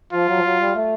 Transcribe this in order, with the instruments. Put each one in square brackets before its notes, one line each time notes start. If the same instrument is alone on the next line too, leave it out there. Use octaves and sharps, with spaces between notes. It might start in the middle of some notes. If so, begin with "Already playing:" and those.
[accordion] F3 [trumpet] F4
[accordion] F#3
F3
F#3
G3
A3